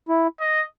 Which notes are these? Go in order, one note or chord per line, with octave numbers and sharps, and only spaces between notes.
E4
D#5